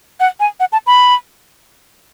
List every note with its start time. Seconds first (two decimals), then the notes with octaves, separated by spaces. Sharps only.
0.20 F#5
0.40 G#5
0.60 F#5
0.72 A5
0.87 B5